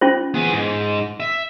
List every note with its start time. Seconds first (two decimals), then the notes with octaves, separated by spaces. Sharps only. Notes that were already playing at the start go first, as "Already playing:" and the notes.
0.01 C#4 F4 C5
0.34 B3 G#4
0.53 G#2
1.20 E5